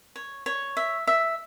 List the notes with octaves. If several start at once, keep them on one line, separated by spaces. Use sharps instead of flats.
C#5
C#5
E5
E5